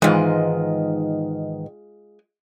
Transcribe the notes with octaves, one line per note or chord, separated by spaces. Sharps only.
G#2 D#3 E3 G#3 F4